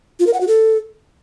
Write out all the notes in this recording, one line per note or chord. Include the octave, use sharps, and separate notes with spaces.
F4
A#4
F#5
F#4
A4